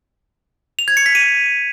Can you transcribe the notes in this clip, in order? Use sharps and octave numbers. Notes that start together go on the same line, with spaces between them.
F7
G#6
C#7
B6
D#7